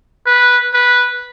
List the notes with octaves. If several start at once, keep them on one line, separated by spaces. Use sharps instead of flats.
B4
B4